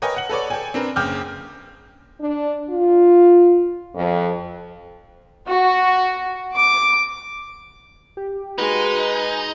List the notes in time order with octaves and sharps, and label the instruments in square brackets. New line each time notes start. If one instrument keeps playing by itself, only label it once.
[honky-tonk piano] A#4 B4 C#5 D#5 G5 G#5
F#5 F#7
A4 B4 C#5 D5
A4 G5 G#5
C4 D4 A#4 B4
F#1 C#3 G5 D6 F6 G6
[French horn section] D4
F4
F2
[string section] F#4
D6
[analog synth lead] G4
[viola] G#3 [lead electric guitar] D#4 [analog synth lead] F#4 [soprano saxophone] B4
[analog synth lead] G#5